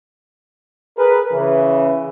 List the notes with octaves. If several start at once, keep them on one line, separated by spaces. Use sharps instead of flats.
G#4 A#4 B4
C#3 E3